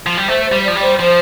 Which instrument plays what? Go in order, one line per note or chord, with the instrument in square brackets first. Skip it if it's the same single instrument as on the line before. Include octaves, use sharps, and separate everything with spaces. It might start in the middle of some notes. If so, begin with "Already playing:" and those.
[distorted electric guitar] F3
G3
[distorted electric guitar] A3 [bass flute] C5
[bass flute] C5
[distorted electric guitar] G3
[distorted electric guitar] F3 [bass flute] D5
[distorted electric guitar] G3
[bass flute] C5
[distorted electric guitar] F3 [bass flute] C5